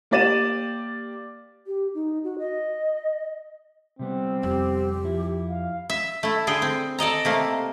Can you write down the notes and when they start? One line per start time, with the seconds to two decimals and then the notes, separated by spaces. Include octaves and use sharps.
0.11 A#3 G4 D5 A6 D#7 E7
1.67 G4
1.94 D#4
2.24 F#4
2.39 D#5
3.99 C3 G3 B3 C4
4.43 F2 G4
5.04 F3 E4
5.50 F5
5.90 E5
6.23 A3 E4
6.47 D3 G#4 G5
6.62 C4
6.98 A4 D5 D#5 A#5
7.25 C3 A3 A#3